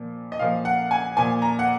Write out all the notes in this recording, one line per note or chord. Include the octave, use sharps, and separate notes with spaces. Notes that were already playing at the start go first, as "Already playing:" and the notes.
Already playing: A#2 F3
D#5
A#2 F3 F5
F#5
G#5
A#2 F3 G#5
A#5
F#5